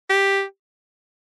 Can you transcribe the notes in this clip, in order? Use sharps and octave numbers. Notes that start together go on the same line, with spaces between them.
G4